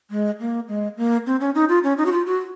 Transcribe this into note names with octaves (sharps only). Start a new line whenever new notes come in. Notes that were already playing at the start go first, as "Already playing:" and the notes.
G#3
A#3
G#3
A#3
C4
C#4
D#4
F4
C#4
D#4
F#4
F4
F#4